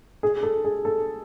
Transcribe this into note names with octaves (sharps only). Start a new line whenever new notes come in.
G#4
A4
G#4
A4